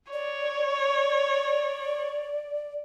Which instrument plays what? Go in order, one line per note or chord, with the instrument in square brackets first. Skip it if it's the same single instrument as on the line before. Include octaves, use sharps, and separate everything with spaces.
[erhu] C#5 [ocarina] D5